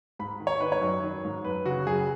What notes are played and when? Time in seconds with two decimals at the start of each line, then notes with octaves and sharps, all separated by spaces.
0.19 G#2 B5
0.40 D#3
0.47 C#5
0.60 D#3 B4
0.72 C#5
0.82 F#2
1.04 D#3
1.24 G#2
1.44 F#2 B4
1.65 C#3 F#4
1.87 F#2 G#4